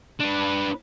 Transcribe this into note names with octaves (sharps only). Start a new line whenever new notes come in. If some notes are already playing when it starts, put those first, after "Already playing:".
D4 B4